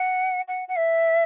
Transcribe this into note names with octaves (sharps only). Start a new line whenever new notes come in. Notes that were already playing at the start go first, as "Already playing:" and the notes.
Already playing: F#5
F#5
F#5
E5